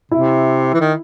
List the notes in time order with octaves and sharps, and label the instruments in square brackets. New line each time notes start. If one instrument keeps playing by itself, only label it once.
[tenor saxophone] C3 [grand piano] E4
[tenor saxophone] E3
D#3